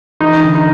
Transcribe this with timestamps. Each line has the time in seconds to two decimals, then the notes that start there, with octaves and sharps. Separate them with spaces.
0.21 E3 D#4
0.43 D3
0.55 D#4